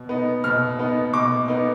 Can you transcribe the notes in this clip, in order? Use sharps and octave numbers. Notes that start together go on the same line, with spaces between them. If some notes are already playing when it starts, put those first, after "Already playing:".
Already playing: B2
B3 D#4
B2 F6
B3 D#4
B2 D6
B3 D#4